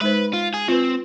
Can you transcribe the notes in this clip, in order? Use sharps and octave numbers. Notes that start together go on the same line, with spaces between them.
G#3 D#4 B4 C5
F4
G#4
C4 F4 B4